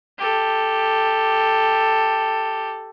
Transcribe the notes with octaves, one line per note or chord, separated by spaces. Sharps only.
G4 A4